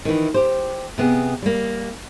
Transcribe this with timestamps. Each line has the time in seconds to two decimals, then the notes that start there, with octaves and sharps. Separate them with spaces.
0.05 D#3 E3
0.34 G4 C5
0.98 C3 B3 G#4
1.43 G3 A#3